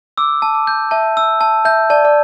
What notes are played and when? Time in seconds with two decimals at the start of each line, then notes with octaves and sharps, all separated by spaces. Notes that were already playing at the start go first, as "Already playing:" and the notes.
0.18 D6 E6
0.42 A5
0.55 D6
0.67 G6
0.91 E5 A5
1.17 E6
1.41 A5
1.65 E5 G6
1.90 D5 A5
2.05 D5